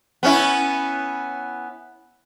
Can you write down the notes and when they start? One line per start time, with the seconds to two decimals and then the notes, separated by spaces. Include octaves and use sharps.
0.23 B3 C#4 E4